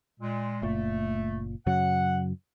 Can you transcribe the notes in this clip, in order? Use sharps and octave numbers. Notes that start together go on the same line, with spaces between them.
A#2 G#3
F#1 A#2 A3
F#2 C#3 F#3 F#5